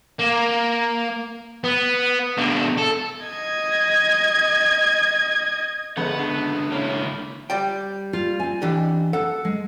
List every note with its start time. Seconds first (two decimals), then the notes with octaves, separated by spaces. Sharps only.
0.20 A#3
1.64 B3
2.38 B2 D4
2.77 A4
3.25 D#5 G#6
5.97 G1 G#3 B3 B4 F#5
6.19 C#2 D4
6.72 A#3 C#4 E4
7.50 G3 D5 G5
8.13 F4
8.40 C4 G#5
8.62 E3 D4 G4
9.13 A4 F#5
9.45 G#3